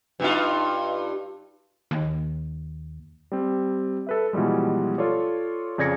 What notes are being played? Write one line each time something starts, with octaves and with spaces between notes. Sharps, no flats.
G2 D#4 F4
D#2
G3 C4
A4 B4 E5
B2 E3 F3 G3 G#3
F4 A4 C#5 D5
F2 C#3 D5 G#6 A#6 C#7